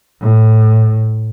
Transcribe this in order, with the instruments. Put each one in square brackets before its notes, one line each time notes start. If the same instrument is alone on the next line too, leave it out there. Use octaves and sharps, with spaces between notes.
[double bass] A2